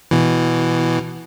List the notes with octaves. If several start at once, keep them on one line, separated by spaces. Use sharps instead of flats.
B2 E3